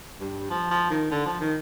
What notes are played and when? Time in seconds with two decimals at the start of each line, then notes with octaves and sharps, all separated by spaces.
0.20 G2
0.50 F3
0.71 F3
0.90 D#3
1.11 D3
1.26 F3
1.41 D#3